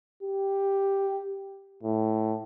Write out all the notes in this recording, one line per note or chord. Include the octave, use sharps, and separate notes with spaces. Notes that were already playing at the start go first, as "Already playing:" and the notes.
G4
A2